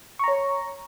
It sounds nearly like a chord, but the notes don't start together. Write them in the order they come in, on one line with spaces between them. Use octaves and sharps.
C#6 A#5 C#5